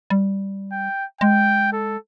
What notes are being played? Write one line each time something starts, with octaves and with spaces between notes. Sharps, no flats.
G3
G5
G#3 G5
A4